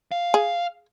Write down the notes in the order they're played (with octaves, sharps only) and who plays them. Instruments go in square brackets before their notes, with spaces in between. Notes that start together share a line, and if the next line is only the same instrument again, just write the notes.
[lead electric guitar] F5
[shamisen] G#4